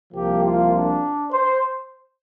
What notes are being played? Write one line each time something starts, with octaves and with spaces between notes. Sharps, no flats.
C2 C3 F3 A#3 G4
F4
D4
C5